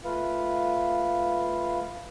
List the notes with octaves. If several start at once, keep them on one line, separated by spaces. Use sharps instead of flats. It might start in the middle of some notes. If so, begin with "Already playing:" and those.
A3 F4 B4 F5